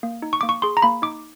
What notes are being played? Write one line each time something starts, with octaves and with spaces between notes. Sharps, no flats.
A#3
D#4
C#6
A#3 D6
C#6
G#4 C6
A#5
A#3 B5
D#4 D6